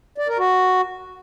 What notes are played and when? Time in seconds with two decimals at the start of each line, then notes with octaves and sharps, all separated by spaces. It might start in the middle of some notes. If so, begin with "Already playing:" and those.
0.18 D5
0.28 A#4
0.38 F#4